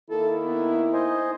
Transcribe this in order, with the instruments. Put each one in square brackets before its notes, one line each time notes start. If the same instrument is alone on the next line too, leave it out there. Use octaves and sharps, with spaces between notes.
[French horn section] D#3 A#3 E4 [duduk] A4
[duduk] B3
[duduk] D#4 [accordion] C5 D#5 G#5